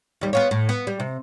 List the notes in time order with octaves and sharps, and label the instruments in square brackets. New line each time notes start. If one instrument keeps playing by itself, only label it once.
[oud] D#2 G3
B3 F4 C#5
A2
B3
G3
C3